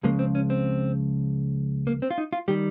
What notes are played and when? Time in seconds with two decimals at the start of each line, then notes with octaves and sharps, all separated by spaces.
0.03 C#2 C#3 F3 G#3 A#3
0.19 C4
0.35 C#4
0.50 C4
1.87 A#3
2.02 C4
2.10 F4
2.18 D#4
2.33 F4
2.48 D#3 G3 G4